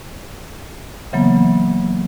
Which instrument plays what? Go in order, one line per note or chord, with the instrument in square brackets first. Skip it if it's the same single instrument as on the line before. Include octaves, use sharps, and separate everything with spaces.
[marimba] C#3 E3 F#3 A#3 B3